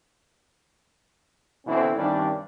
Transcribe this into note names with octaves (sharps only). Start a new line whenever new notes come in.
B2 D3 E3 C4 C#4 E4
G2 C3 D#3 G3 C#4 D4